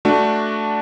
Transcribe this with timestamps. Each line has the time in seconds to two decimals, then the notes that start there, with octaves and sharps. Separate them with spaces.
0.05 A3 D4 F#4